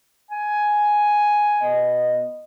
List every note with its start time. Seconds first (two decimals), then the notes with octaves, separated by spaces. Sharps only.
0.31 G#5
1.62 B2 B3 D#5